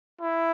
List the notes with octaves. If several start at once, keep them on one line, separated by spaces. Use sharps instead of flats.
E4